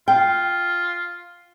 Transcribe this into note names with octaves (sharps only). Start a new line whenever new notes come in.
F4 G5